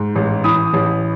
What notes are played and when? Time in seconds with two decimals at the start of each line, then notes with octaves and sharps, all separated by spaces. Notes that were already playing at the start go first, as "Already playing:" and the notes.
Already playing: G#2
0.16 A1
0.44 E3 B5 D#6
0.73 A1